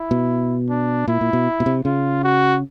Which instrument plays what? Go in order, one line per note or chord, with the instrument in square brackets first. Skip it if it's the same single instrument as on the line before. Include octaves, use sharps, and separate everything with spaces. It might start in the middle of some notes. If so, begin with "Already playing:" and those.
Already playing: [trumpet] E4
[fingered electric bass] B2
[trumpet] D4
[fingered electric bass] A#2 [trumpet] E4
[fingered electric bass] A#2
B2
B2
C3
[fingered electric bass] C#3 [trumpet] F4
[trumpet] F#4